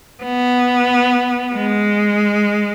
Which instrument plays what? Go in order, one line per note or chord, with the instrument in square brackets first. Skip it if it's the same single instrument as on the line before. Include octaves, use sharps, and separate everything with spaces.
[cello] B3
G#3